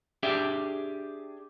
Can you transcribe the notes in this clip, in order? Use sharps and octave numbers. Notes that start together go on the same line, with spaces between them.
D4 G4 G#4 D5 E5